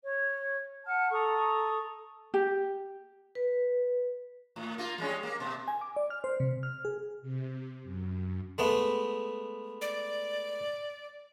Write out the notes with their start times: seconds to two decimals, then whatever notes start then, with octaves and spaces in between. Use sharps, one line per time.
0.03 C#5
0.84 F#5 A5 F6
1.10 A4 A#5 C#6 D#6
2.34 G4
3.35 B4
4.56 A2
4.78 A#3 F4
4.98 G3 G#3 C#4
5.23 A#3
5.40 B2
5.68 G#5
5.81 D6
5.96 D5
6.10 F6
6.24 C5
6.40 C3
6.63 F6
6.85 G#4
7.22 C3
7.83 F#2
8.58 G#3 A3 B3
9.81 D5